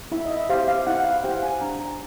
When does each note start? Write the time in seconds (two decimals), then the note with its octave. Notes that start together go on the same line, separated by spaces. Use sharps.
0.12 E4 E5
0.26 D#5
0.31 E5
0.49 G4 C5 F5
0.68 F5
0.87 E4 F#5
1.05 F5
1.16 F#5
1.24 G4 C5 G5
1.43 G#5
1.61 D4 A#5
1.80 A#5